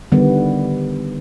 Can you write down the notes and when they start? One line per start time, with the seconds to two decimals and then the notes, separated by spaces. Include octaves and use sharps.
0.12 D3 D#3 G3 B3